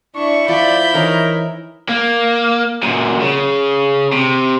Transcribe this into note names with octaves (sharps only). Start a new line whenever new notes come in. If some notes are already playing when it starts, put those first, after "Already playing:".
D4 E4 C#6
F3 D5 B5 G6
E3 D#4 A#4 C#5
A#3
F#2 A#2
C#3
C3